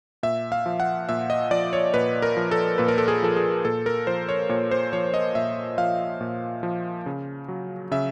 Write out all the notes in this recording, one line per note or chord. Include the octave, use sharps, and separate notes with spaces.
A#2 E5
F5
F3
F#5
A#2 E5
D#5
F3 D5
C#5
A#2 B4
A#4
F3
A4
A#2 B4
A#4
A4
G#4
F3 A4
G#4
A#2 A4
A#4
F3 C5
C#5
A#2 C#5
C5
F3 C#5
D#5
A#2 E5
F3 F5
A#2
F3
C#3
F#3
C#3 E5